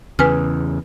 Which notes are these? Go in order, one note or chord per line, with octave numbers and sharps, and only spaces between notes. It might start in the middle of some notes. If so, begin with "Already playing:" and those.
E2 C#3 B4 G#5 F6